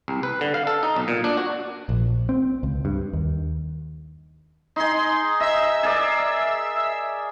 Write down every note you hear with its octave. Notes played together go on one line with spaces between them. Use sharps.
C2
B4
D3
F5
A4
D#4
B1
A#2
D4
F#4
A#1
C4
C#2
G2
D#2
D#4 G#4 C6
D#5 E5 E6
G#4 A#4 D5